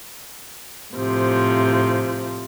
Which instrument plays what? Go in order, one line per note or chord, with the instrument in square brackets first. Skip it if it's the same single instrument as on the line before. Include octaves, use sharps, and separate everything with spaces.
[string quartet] A2 C3 F3